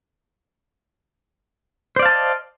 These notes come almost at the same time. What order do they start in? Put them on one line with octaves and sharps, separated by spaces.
C5 D5 F5 A5 D#5